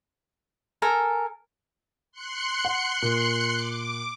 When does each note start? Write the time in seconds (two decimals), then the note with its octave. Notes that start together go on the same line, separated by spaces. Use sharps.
0.82 A4 A#4 G#5
2.12 C6 F#6 C#7
2.65 F#5
3.02 A#2
3.52 D6